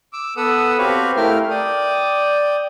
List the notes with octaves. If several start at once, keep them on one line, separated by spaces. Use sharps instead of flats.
D6 E6
B3 A4 B4 F#5 D#6 E6
C4 F#4 G4 B4 C#5 F5
A3 E4 A#4 F5 G5 F6
D5 G5 D#6